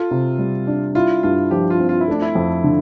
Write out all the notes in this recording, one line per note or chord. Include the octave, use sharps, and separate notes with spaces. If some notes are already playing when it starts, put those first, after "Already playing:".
Already playing: F4 A4
C3
G3
D4
E4 F4
G2 F4
F3 G4
F4
C4
F4
E4
A3 D4
E4
F2
D3